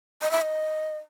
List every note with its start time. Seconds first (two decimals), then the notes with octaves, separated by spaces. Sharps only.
0.22 D#5
0.31 E5
0.42 D#5